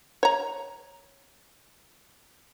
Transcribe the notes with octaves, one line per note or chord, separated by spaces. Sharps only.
C#5 A#5